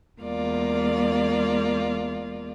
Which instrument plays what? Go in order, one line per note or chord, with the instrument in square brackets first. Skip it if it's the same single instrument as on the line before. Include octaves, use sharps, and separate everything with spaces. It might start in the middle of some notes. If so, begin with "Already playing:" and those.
[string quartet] E2 G#3 A#3 F4 D5